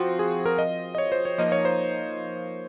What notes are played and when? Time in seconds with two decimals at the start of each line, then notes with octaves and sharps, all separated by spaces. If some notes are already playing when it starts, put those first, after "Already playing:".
Already playing: F3 C4 F4 F#4
0.19 G#4
0.46 A#4
0.58 D#5
0.95 D#5
0.98 C#5
1.12 C5
1.25 C#5
1.38 F3 A#3 D#4 D#5
1.52 C#5
1.65 C5